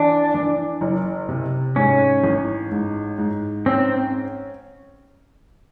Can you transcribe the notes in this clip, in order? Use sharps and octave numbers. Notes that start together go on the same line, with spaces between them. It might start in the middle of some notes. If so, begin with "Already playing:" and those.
Already playing: E3 D4
E3
F#1
C3
G#2 C#4
A1
G#2
G#2
C4 C#4